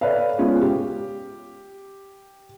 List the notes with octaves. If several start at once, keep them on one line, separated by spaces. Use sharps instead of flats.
A4 B4 C#5 D5 E5 F5
G#3 B3 C#4 F4
G4